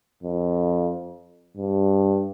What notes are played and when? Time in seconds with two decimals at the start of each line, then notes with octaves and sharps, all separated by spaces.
0.23 F2
1.57 G2